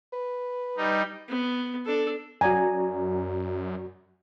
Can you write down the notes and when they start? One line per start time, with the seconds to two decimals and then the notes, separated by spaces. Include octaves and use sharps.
0.13 B4
0.77 G3 D#4
1.29 B3
1.85 D4 A4
2.41 F#2 F#4 D5 G#5 A#5